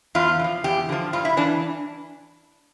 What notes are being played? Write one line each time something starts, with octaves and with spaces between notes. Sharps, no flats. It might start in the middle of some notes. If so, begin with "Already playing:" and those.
E2 F4
D3
F3
E2 G4
D3 F3
G2 F4
E4
E3 D4